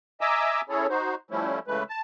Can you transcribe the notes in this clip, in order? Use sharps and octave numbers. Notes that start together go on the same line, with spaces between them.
D#5 E5 G#5 A#5 D6 E6
C#4 E4 G#4 A4 C#5
D#4 F#4 C5
F3 G3 A3 C#4 E4
C#3 E3 G#3 A3 B4
A5